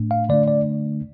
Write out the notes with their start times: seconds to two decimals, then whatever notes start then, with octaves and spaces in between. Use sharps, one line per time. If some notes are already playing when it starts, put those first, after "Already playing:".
Already playing: A2 A3 D4
0.11 F5
0.29 D3 A3 D4 D5
0.48 D5